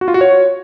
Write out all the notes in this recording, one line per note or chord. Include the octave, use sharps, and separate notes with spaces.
F#4
F4
F#4
C#5